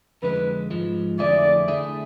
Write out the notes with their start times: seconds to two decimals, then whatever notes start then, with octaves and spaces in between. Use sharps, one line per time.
0.23 F2 D3 G#3 B4
0.70 G#2 F3 G#3
1.19 F2 D3 A3 E4 G#4 D5
1.68 D3 A3 E4 G#4